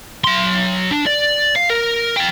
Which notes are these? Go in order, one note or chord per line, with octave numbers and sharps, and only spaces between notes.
F#3 C6
D4
D5
F5
A#4
F3 G5